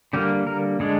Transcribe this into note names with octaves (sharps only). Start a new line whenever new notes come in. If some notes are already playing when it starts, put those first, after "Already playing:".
D3 G3 A#3 G4
A#4
D3 G#3 D4 G#4